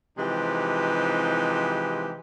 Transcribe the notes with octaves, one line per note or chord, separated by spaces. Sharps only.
C3 E3 F3 G#3 D#4 G4